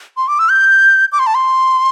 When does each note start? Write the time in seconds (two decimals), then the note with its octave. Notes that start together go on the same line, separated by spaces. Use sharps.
0.17 C6
0.28 D6
0.39 E6
0.50 G6
1.12 D6
1.19 C6
1.27 A5
1.35 C6